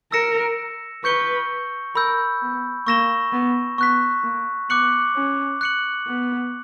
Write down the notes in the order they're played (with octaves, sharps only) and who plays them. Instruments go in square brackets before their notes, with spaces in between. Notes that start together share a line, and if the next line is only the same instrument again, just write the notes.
[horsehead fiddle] A#4 [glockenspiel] E6 A#6 C#7 E7
[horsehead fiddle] B4 [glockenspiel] C#6 G6 C#7 G7
[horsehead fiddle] A#4 [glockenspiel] B5 E6 G6
[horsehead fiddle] B3
[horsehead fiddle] A#3 [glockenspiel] C#6 E6 A#6 E7 G7
[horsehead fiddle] B3
[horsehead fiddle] B3 [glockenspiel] C#6 F#6 B6
[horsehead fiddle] A#3
[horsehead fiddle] B3 [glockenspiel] D6 F#6 C#7 F#7
[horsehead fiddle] C#4
[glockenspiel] F#6 C#7 F#7
[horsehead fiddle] B3